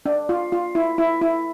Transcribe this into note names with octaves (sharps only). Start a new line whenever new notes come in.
D4
F4
F4
E4
E4
E4